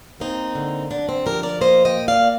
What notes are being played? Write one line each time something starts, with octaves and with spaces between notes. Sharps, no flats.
A#3 C4 D#4
D3
D3 D4
C4
F3 G4 A#4
A#4 D5
A#3 C5 D#5
D#5 G5
A#2
D5 F5